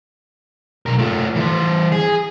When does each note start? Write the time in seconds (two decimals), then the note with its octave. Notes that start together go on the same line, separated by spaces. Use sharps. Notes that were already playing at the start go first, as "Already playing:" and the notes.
0.86 B1 A#4
0.99 A3 F4
1.35 E3 C5
1.92 G#4